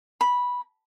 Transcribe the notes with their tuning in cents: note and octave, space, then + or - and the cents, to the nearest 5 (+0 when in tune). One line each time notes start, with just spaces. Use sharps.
B5 -10